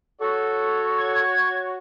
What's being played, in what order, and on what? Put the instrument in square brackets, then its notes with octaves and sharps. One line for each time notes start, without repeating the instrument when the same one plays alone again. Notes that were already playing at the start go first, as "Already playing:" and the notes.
[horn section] F#4 C#5 [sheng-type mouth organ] A4
[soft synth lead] G#6